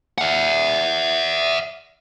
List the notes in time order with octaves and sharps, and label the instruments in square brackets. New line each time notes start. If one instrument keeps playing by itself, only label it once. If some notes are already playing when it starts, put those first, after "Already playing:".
[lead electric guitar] E5 F#5